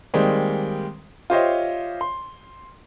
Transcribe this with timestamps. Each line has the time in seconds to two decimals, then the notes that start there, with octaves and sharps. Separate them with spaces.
0.14 D#3 G3 G#3 A#3 C4
1.30 F4 G4 C5 C#5 D#5 E5
2.01 C6